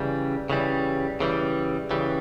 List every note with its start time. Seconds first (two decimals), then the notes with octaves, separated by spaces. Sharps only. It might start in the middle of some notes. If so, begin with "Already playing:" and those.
Already playing: C#3 E3 G3
0.50 C#3 E3 G3
1.20 C#3 E3 G3
1.91 C#3 E3 G3